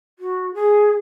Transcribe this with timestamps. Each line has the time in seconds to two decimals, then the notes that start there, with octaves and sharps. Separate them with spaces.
0.19 F#4
0.54 G#4